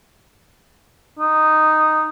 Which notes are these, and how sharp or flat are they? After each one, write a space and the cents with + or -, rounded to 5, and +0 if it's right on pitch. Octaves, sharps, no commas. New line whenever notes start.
D#4 -5